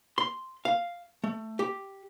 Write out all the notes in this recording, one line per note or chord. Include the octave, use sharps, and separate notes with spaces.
C6
F5
A3
G4